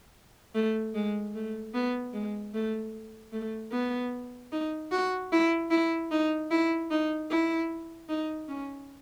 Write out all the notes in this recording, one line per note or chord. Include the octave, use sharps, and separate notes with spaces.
A3
G#3
A3
B3
G#3
A3
A3
B3
D#4
F#4
E4
E4
D#4
E4
D#4
E4
D#4
C#4